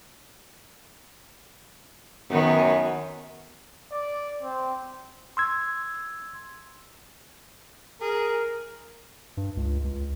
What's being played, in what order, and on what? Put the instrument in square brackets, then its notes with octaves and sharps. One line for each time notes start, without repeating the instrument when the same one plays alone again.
[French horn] F#2 [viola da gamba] D#3 B3 C#5
[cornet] D5
C4
[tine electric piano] C6 E6 G#6
[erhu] G#4 [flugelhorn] A#4
[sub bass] G2
C#2
C#2